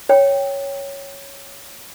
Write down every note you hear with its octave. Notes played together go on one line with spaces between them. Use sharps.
C#5 G5